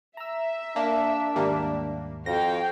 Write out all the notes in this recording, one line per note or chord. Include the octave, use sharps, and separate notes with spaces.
E5 A#5 E6
A#3 D4
D#2 G#2 G3 A#3
F2 F#4 F5 G5 A#6